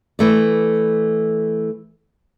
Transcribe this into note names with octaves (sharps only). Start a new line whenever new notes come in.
E3 A3 D5